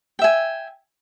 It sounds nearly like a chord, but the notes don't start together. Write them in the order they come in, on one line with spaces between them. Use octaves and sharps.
G5 E5 G#5